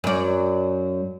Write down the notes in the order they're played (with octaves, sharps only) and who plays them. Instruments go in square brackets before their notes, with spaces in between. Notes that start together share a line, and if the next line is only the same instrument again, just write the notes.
[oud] F#2 D5